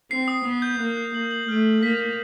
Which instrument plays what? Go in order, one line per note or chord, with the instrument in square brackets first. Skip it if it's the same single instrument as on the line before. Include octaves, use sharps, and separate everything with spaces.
[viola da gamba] C4 [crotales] C7
[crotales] D#6
[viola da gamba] B3 [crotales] D#6
[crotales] G6
[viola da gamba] A#3 [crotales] F#6
[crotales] F#6
[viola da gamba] A#3 [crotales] F#7
[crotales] F#7
[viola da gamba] A3 [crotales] F6
[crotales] F#7
[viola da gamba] A#3 [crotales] B6
[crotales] B6